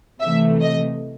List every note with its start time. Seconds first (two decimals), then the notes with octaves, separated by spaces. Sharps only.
0.20 C3 E3 A3 E5
0.61 D#5